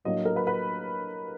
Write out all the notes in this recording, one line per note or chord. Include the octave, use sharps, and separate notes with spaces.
A2 F#3 A#3 D4 D#5
A#4
B4
B4